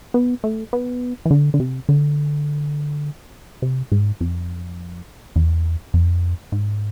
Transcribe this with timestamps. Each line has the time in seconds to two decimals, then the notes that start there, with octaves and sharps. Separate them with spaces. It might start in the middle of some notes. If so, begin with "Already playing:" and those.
0.14 B3
0.44 A3
0.73 B3
1.25 E3
1.31 D3
1.54 D3
1.60 C3
1.89 D3
3.62 C3
3.92 G#2
4.21 F2
5.36 E2
5.94 F2
6.52 G#2